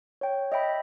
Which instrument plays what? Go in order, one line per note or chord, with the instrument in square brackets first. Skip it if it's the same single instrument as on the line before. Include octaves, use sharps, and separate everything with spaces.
[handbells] C#5 G5
D#5 E5 G5 B5